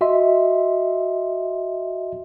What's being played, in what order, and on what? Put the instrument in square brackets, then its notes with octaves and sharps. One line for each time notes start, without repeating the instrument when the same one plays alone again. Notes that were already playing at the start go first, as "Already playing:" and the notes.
[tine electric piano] F#4 D#5 E5 C6